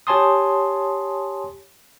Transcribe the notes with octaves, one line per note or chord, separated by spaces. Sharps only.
G4 C#5 G#5 A5 C6 D#6